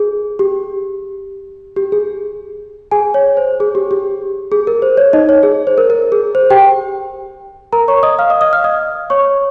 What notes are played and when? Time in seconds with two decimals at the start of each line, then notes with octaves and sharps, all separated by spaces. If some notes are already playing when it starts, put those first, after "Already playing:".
Already playing: G#4
0.39 G4
1.76 G4
1.92 G#4
2.91 G#4 G#5
3.14 C#5
3.37 C5
3.60 G#4
3.75 G4
3.91 G4
4.52 G#4
4.67 A#4
4.82 C5
4.97 C#5
5.13 D#4 D#5
5.29 C#5
5.43 G#4
5.67 C5
5.78 A#4
5.90 A#4
6.12 G#4
6.35 C5
6.50 G4 G5
7.73 A#4 A#5
7.88 C#5 C#6
8.03 D#5 D#6
8.19 F5 F6
8.30 D#5 D#6
8.41 D#5 D#6
8.53 F5 F6
8.64 D#5 D#6
9.10 C#5 C#6